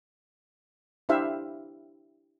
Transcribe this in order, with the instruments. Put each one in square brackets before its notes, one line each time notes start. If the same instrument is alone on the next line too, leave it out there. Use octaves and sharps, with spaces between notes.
[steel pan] D4 E4 G4 C5 E5 F5